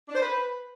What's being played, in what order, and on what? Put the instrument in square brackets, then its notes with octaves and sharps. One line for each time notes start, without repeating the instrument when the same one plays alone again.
[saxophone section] D4
C5
B4